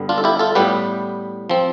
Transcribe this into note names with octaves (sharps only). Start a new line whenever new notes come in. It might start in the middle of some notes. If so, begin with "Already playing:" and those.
Already playing: G2 D3 G3 B3
D4 F4
A4
E4 G4
F4 A4
A2 G3 B3 G4 B4
F3 C4